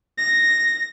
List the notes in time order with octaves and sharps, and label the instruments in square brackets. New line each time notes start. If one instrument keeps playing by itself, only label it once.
[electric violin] A#6